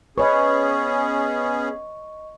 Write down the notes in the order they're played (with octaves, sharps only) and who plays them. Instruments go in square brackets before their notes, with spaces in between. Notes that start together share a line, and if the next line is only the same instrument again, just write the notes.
[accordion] B3 C#4 G#4 [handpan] B4 C#5 [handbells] D#5 C#6